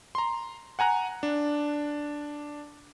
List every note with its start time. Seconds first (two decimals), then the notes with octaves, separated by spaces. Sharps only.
0.15 A#5 C6
0.79 F#5 G#5 A#5 F#6
1.23 D4